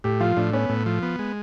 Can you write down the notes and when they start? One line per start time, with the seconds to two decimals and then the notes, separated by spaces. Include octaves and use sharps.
0.04 A2 G4
0.20 F3 F4
0.37 A2 D4
0.53 B3 C#4
0.69 A2
0.86 F3
1.03 B3
1.19 G#3